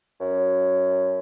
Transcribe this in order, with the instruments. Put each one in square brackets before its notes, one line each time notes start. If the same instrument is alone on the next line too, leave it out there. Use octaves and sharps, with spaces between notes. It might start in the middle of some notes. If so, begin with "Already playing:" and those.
[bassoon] F#2